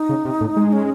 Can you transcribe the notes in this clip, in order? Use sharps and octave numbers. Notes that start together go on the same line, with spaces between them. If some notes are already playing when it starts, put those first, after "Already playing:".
Already playing: D#4
C#3
C3
A2
G#3
C#4